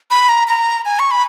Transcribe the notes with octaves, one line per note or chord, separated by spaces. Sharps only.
B5
A#5
A#5
G#5
C#6
B5